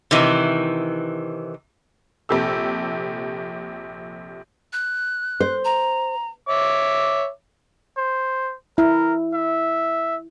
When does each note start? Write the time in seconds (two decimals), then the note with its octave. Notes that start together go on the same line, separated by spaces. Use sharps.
0.11 C3 D#3 E3
2.29 A#1 C3 G4 A4 E6
4.73 F#6
5.40 C5
5.65 A#5
6.48 C#5 E5 D6
7.97 C5
8.78 E4 A#4
9.34 E5